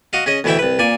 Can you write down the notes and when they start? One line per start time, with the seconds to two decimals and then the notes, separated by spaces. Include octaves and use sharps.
0.13 F#4 D#5 F5
0.26 C#4 G#4 D#5
0.44 D2 B2 E3 E4 E5 G5
0.59 C2 B4
0.79 A#2 D5 G#5